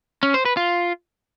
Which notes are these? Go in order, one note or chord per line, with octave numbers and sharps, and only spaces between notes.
C#4
C5
B4
F4